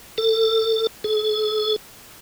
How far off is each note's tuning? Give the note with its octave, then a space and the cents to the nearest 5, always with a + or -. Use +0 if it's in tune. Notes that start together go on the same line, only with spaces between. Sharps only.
A4 +25
A4 -45